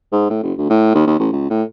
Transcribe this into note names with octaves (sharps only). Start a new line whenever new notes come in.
G#2
A2
F#1
D2
A2
D#2
D#2
A1
C#2
A2